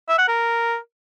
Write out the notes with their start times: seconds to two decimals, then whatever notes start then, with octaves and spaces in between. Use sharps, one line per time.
0.09 E5
0.18 F#5
0.28 A#4